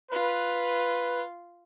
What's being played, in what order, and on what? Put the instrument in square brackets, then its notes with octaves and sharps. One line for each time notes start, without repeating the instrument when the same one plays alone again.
[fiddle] F4 [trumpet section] B4